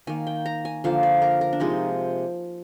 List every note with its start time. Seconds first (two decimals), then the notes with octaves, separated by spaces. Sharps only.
0.07 D#3 A#3 G#5
0.27 G5
0.46 A#5
0.65 G#5
0.84 D3 F3 A#3 F5
1.03 D5
1.22 A#4
1.41 A#4
1.53 D4
1.60 C3 F3 G#3 D#4